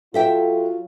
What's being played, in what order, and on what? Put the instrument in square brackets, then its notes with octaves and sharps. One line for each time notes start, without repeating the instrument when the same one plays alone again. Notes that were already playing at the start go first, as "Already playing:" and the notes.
[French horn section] F#3 F4 [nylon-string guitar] A4 E5 G5